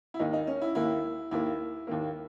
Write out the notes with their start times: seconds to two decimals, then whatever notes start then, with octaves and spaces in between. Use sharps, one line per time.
0.14 E4
0.19 D#2 D#3 A#3 D#4
0.33 D#4
0.47 C#4
0.62 E4
0.75 D#2 D#3 A#3 E4
1.31 D#2 D#3 A#3 E4
1.87 D#2 D#3 A#3